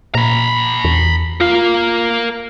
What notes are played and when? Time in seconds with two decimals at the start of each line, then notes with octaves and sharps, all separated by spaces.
0.15 A#2 A#5 B5
0.84 E2
1.40 F4 A#4 F5